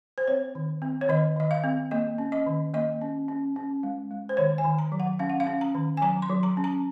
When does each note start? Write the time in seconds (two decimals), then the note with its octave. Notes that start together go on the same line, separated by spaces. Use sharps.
0.18 C5
0.28 C4 C#5
0.55 D#3
0.82 C4
1.01 C#5
1.09 D#3 D#5
1.36 D#3 D#5
1.51 F5
1.64 C4
1.91 A#3 D#5
2.18 C#4
2.32 D#5
2.46 D#3
2.74 A#3 D#5
3.01 C#4
3.28 C#4
3.56 C#4
3.83 G#3
4.11 G#3
4.29 C5
4.37 D#3 C#5
4.58 G#5
4.64 D#3
4.79 A#5
4.92 F#3
5.00 F#5
5.19 C#4 F5
5.30 F#5
5.40 F5
5.47 C#4
5.61 A#5
5.75 D#3
5.97 G#5
6.02 F#3 A#5
6.22 C6
6.30 F#3
6.43 A#5
6.57 C#4
6.64 A#5